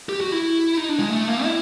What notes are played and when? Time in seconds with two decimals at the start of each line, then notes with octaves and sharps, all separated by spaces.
0.09 G4
0.21 F#4
0.32 E4
0.77 D#4
0.89 D4
0.99 G#3
1.10 A3
1.28 A#3
1.44 E4